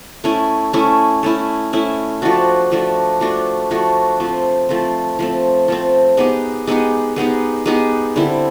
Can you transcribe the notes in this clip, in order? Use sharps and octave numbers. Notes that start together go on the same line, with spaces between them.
A3 C#4 E4
A3 C#4 E4
A3 C#4 E4
A3 C#4 E4
F3 A3 D4 F#4
F3 A3 D4 F#4
F3 A3 D4 F#4
F3 A3 D4 F#4
F3 A3 C4
F3 A3 C4
F3 A3 C4
F3 A3 C4
G#3 B3 D#4 G4
G#3 B3 D#4 G4
G#3 B3 D#4 G4
G#3 B3 D#4 G4
D3 G3 C4 E4